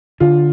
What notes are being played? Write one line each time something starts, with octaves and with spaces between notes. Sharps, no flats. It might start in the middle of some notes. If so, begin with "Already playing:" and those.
D3 F4